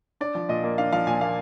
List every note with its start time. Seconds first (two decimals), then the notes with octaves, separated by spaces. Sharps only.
0.21 D4 D5
0.35 F3
0.49 A#2 D#5
0.64 A#3
0.78 D4 F5
0.93 F3 F5
1.07 A#2 G#5
1.21 A#3 F5